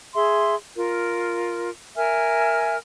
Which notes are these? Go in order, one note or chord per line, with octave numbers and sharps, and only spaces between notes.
G#4 E5 C6
F4 A#4
A#4 E5 G#5 F6